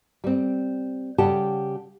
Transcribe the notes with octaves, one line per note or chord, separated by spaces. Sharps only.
G3 C4
C#3 G3 G4 F#5 G5 A5